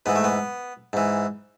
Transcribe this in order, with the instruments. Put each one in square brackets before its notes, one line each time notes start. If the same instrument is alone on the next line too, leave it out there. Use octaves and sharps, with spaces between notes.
[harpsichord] G#2 E3 B3
A3
B3
G#2 E3